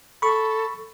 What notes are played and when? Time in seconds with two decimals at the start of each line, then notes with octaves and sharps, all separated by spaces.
0.22 A4 B5 C#6